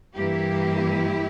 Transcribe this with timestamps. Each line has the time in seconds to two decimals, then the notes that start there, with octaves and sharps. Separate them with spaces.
0.15 G2 E3 A#3 E4 G4